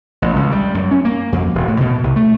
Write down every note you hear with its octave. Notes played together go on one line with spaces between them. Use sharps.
A1
C#2
G3
F#2
C#4
A#3
F2
E1
A2
B2
C2
A3